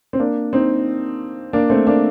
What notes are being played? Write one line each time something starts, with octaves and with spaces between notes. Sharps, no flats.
C4
A#3 D4
C4 D#4
A#3 D4
A3 C4
A#3 D4